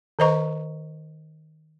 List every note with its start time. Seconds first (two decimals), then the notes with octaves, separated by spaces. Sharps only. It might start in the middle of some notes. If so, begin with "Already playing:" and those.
0.19 D#3 B4 C5 D#5 A#5 C#6